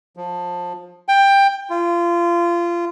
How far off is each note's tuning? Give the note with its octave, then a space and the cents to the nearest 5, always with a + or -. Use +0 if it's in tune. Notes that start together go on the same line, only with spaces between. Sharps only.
F3 +20
G5 +15
F4 -25